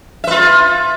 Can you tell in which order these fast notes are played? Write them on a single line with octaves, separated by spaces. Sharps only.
E5 B4 F4